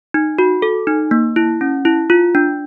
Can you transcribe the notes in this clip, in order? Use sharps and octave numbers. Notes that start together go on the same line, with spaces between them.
D#4
F#4
A4
D#4
A#3
E4
C#4
E4
F4
D4